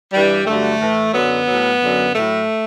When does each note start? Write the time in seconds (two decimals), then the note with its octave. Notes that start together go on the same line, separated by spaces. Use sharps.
0.13 G2 E3 G3
0.47 G2 D3 F#3 A3
0.80 A2 E3
1.14 F#2 D3 F#3 B3
1.48 A2 F#3
1.81 F#2 D3 F#3
2.15 A2 F#3 A3